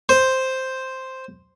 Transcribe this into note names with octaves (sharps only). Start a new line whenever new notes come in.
C5